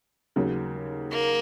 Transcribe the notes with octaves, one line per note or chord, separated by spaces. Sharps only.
D#2 C#3 F#3
A#3